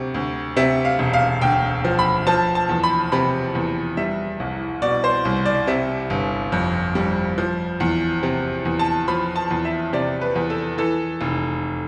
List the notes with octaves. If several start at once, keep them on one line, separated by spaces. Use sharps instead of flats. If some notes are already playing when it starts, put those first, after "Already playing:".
Already playing: D2 C3
D2
C3 E5
F5
E1
F5
D2 G5
F3
B5
F3 A5
A5
E2
B5
C3 B5
E2
G3 E5
C2
B2 D5
C5
C2
D5
C3 E5
G1
F2
G3
F3
E2
C3
E2
A5
F3 B5
A5
E2
E5
C3 D5
B4
E2
A4
E3 A4
F1